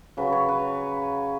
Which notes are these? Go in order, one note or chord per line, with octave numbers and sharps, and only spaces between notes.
C#3 F#3 B4
C#5
B4